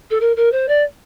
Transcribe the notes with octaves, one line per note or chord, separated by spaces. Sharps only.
A4
A#4
A#4
C5
D5